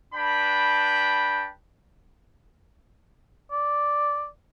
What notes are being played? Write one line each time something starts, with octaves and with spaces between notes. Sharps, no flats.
D4 B4 G5 A5 B5
D5